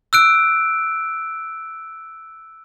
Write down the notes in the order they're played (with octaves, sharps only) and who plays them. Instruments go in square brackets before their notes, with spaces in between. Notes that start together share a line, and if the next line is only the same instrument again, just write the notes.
[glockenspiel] E6 F#6 D7